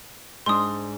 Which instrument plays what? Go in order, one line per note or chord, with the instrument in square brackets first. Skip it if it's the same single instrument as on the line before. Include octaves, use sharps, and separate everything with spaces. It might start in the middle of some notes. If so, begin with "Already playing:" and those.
[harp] G#2 D4 [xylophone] C6 D#6